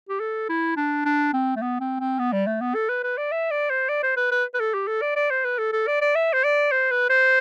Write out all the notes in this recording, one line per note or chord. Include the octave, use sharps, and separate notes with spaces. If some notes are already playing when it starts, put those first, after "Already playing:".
G4
A4
E4
D4
D4
C4
A3
B3
C4
C4
B3
G3
A3
B3
A4
B4
B4
D5
E5
D5
C5
D5
C5
B4
B4
B4
A4
G4
A4
D5
D5
C5
B4
A4
A4
D5
D5
E5
C5
D5
C5
B4
C5